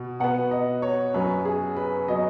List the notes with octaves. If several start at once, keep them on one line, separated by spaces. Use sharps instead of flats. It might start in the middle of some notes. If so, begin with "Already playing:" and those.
Already playing: B2 B3
B2 B3 F#5
D#5
C#5
F#2 F#3 B3 B4
G#4
B4
F#3 B3 D#5